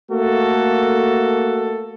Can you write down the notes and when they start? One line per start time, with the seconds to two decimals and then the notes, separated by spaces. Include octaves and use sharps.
0.11 A3 A#3 F#4 A4